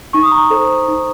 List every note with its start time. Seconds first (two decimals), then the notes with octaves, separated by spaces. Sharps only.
0.13 D#4 C#6
0.23 D#6
0.31 A#5 C#6
0.50 A4 C5
0.88 D#4